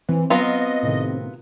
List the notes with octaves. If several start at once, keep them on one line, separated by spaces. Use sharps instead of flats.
E3 C4
F#3 B3 F4 D#5
A2 C3 D#3